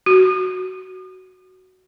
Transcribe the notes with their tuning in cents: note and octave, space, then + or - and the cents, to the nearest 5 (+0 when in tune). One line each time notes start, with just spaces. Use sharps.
F#4 +10